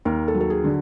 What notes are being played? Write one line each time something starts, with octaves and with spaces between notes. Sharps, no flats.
D#2 A#4
A4
F#3
A4
G#4
D3